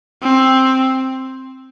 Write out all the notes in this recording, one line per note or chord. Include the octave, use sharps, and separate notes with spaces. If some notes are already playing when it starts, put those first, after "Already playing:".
C4